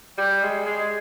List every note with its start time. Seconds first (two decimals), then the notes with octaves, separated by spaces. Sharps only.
0.18 G3
0.43 G#3
0.66 G#3